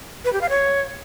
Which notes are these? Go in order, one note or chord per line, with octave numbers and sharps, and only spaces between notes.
B4
G4
F5
C#5